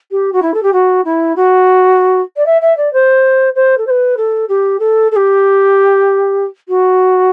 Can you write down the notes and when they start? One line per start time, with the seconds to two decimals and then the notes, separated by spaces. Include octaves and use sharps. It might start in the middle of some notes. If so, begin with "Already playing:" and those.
0.11 G4
0.33 F#4
0.42 E4
0.54 A4
0.63 G4
0.73 F#4
1.05 E4
1.36 F#4
2.37 D5
2.46 E5
2.62 E5
2.77 D5
2.93 C5
3.55 C5
3.78 A4
3.87 C5
3.90 B4
4.17 A4
4.49 G4
4.80 A4
5.12 A4
5.16 G4
6.69 F#4